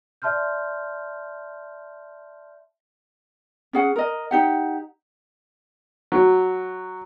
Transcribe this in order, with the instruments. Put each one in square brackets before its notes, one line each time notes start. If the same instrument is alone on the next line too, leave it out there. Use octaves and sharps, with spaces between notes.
[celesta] D5 E5 A5 C6 F6 G6
[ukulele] C#4 G#4 F#5
A#4 D#5
D#4 G4 F#5
[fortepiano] F#3